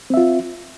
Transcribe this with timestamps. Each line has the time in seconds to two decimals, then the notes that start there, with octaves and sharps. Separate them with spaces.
0.10 C4
0.14 E5
0.17 F4